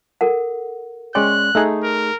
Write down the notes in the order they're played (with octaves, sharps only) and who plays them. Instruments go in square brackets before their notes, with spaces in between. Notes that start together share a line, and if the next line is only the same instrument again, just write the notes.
[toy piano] A4 A#4 F#5
[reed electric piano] G#3 C#4 D5 [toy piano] G5 C6 [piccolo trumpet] F#6
[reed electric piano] A3 D#4 G#4 [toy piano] E6
[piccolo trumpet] A#4